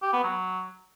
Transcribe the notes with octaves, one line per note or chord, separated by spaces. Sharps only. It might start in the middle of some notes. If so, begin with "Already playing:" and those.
G4
B3
F#3